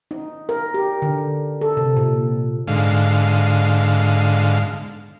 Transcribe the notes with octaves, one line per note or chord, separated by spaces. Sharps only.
D#4
A#4
G4
D3
A4
C3
A#2
G#2 D3 F5